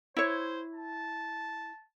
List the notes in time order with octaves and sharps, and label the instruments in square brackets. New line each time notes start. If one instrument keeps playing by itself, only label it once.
[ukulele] E4 C#5 [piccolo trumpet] C5
[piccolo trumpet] A5